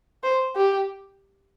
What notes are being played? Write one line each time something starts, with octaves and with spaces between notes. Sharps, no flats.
C5
G4